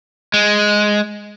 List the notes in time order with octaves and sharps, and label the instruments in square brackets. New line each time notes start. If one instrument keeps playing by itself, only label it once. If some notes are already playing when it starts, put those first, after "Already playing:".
[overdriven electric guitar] G#3